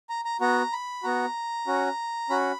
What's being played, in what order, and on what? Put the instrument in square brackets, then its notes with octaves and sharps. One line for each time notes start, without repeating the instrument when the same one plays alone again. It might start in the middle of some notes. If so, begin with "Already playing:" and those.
[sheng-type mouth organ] A#5
A#5
B3 F#4 A#5
B5
B3 F#4 A#5
C#4 F#4
C#4 F#4 B5